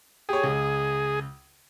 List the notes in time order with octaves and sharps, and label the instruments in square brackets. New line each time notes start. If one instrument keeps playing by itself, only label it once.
[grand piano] G4 C#5 [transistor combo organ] G#4
[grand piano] C#2